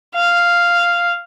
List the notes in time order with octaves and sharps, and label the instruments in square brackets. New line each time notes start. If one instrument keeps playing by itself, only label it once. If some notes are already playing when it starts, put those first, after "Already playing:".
[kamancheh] F5